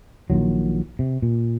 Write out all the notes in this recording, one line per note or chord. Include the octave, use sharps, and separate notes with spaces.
A#1 A#2 D#3 F#3
C3
A#2